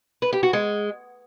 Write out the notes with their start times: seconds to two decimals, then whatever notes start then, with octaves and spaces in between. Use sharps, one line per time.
0.22 B4
0.32 G4
0.43 F#4
0.53 G#3